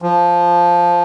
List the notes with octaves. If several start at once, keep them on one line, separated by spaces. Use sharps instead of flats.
F3